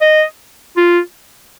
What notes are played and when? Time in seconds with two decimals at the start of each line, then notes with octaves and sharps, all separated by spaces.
0.01 D#5
0.77 F4